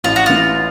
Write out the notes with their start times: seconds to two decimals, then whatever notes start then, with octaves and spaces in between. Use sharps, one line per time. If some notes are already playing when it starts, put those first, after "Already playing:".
0.04 A1 F4
0.16 F#4
0.26 E3 F4